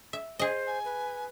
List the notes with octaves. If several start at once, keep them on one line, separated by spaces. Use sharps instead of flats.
E5
G#4 C5 D#5
G#5
B4